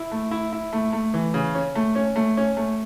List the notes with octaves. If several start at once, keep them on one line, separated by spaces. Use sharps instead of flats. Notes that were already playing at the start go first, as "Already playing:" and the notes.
Already playing: E4
A3
E4
E4
A3
A3
E3
C#3
C#4
A3
C#4
A3
C#4
A3